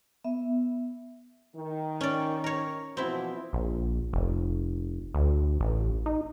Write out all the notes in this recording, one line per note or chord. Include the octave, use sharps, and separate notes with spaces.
B3 E5
D#3
C#4 D5
A#4 C#5
B2 E3 F3 C4 E4
A#1
F1
D2
A1
D#4